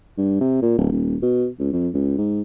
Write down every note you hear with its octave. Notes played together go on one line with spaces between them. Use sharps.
G2
C3
A#2
D1
D#1
B2
C#2
F2
C#2
G#2